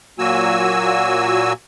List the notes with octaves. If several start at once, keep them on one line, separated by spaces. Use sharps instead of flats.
A#2 F#3 A#3 F#4 G#5 E6